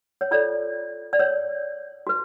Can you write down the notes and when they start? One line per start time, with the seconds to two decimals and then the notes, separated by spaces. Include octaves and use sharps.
0.21 C#5
0.31 F4 A4 C#5 D5
1.13 D5
1.20 C#5
2.07 F#4 B4